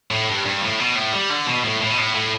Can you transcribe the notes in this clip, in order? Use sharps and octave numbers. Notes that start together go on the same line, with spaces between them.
A2
G2
G2
A2
B2
A2
G3
D3
B2
A2
A2
B2
A2
A2